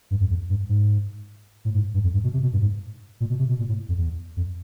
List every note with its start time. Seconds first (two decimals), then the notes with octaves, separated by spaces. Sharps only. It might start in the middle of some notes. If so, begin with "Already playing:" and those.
0.11 G2
0.20 F#2
0.30 E2
0.50 G2
0.69 G#2
1.65 A2
1.75 G#2
1.94 G2
2.04 F2
2.14 G2
2.24 B2
2.33 C3
2.43 B2
2.53 G2
2.62 G#2
3.20 A#2
3.30 B2
3.39 C3
3.49 B2
3.59 A#2
3.68 A2
3.89 F2
3.97 E2
4.36 F2